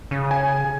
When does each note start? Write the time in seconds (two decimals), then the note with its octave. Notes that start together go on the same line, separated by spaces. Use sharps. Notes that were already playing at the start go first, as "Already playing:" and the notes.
0.11 C#3
0.31 G#5